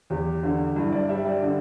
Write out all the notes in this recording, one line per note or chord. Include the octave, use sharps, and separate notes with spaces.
E2 G4
D3
G2 E4
D5
G3 E5
D5
D3